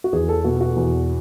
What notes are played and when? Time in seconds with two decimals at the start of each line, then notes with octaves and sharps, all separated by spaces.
0.04 F#4
0.13 E2 G#4
0.29 A4
0.44 B2 F#4
0.61 F#4
0.76 E2